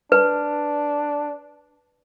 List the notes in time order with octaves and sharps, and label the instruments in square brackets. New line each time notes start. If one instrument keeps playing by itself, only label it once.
[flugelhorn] D4 [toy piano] B4